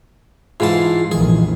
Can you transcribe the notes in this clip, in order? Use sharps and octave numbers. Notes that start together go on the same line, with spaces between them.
G#2 E3 F4 A5 C6
A#1 F2 D#3 E3 G#4